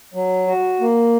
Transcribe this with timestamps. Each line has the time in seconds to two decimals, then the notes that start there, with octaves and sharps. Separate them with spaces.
0.14 F#3
0.47 F#4
0.80 A#3